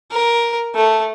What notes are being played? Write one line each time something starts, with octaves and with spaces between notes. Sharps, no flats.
A#4
A3